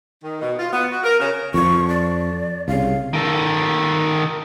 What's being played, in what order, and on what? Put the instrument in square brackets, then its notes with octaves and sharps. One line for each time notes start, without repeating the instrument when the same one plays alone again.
[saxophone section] D#3
B2
F4
B3
F#4
A#4
C#3
[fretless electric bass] F2 F3 [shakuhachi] C#6
[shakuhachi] D5
[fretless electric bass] C2 C#3 [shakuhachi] F5
[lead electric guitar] D#3 A4